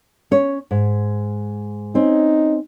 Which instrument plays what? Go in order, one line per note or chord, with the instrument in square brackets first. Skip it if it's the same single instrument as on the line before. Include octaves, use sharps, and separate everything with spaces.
[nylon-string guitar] C#4 C#5
G#2
[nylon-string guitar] C4 C#4 [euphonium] D#4